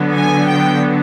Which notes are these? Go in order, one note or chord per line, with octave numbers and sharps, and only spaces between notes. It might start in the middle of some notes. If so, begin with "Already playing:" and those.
Already playing: D3 F#3 B3
G#5
G5